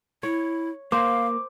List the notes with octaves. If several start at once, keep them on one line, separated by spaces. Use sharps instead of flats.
E4 C#5
A#3 C5 F5 D6